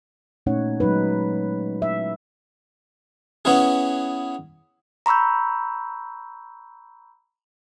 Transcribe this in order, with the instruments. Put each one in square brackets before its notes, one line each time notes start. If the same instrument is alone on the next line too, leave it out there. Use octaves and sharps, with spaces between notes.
[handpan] A#2 A3 C#4 D#4 C#5 F#5
F#3 G#3 D#4 B4
E5
[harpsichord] B3 C#4 E4 G#4
[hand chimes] A#5 B5 C#6 E6 G6